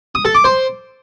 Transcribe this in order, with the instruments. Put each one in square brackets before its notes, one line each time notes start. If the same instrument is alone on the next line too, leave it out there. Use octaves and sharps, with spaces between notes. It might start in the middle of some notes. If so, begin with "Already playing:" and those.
[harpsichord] D#6
A4
D6
C5